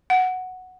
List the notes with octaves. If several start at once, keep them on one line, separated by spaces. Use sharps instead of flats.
F#5